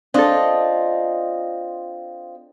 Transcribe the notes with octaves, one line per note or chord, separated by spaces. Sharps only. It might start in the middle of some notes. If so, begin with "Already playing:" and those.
C4 D4 F4 A4 D#5